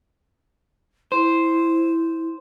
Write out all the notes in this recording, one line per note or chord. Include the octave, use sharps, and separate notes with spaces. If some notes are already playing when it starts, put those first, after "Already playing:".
E4 C5